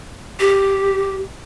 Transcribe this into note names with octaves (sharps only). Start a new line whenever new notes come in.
G4